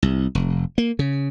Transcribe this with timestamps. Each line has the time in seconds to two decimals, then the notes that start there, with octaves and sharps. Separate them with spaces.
0.03 C2
0.35 F1
0.78 A#3
0.99 C#3